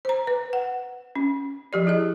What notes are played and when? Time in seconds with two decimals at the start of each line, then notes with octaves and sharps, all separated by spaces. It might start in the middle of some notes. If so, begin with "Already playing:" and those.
0.05 C5 A#5
0.27 B4
0.53 F#5
1.15 C#4
1.73 F3 G4 D5
1.87 E4 G#4 D#5